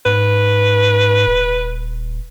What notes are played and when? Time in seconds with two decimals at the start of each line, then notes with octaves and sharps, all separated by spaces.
0.06 G#2 B4
1.27 D#1